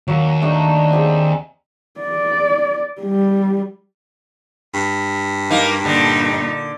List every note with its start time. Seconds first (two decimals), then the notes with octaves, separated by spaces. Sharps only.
0.08 D#2 F#3 A#3
0.41 A3 D4 D#4
0.91 C4 G4 G#4
2.00 D5
3.01 G3
4.74 G2
5.50 F#3 A#3 D#4
5.85 A#2 D3 D#4